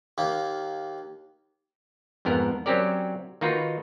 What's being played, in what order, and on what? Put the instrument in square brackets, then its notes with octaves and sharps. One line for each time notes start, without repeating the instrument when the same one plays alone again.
[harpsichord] D#2 A#3
[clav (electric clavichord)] F2 G#2 B3 A#4
F#3 C4 C#4 G4 A#4 D5
D#3 A#3 D#4 F4 F#4 B4